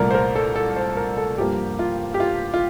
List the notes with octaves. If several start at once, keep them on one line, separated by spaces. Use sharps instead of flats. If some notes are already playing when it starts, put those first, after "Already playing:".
Already playing: C2 A#2 A3 A#4 D5
C5
A#4
A4
A4
C5
A#4
A4
G2 F3 A#3 G4
F4
G4
F4
F4